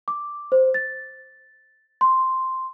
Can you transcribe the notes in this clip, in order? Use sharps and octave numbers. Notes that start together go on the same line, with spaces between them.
D6
C5
A6
C6